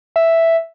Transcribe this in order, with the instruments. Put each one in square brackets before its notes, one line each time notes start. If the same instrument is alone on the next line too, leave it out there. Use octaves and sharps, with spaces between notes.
[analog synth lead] E5